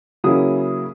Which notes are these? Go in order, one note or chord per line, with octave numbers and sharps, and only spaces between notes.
C#3 F#3 A#3 C#4 E4 D#6